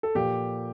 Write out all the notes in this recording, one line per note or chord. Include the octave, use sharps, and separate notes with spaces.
A4
A#2 F3 A#3 G4